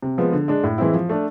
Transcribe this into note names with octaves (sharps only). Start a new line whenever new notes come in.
C3
F3 G#3 B3
D3
G#3 D4
A2
E3 G#3 C4 E4
F3
A3 D4